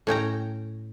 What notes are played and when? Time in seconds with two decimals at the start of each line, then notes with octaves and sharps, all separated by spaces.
0.07 A2 C#4 G5 A#5